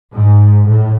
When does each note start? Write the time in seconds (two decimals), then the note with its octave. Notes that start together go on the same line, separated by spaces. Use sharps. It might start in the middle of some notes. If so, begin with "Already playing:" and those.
0.16 G#2
0.68 A2